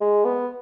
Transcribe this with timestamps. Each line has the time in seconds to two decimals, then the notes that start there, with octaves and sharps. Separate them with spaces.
0.01 G#3
0.24 B3